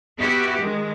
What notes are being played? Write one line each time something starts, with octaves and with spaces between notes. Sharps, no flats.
B3 E4 F#4 G4
D#3 G#3